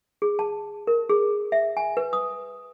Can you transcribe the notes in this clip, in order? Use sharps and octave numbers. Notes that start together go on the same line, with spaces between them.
G#4
A5
A#4
G#4
E5
G#5
B4
D#6